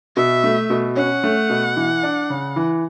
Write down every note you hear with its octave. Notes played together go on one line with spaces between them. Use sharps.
B2 E5
A3
B2
C#4 F#5
A3
B2
E3
D4
C#3
E3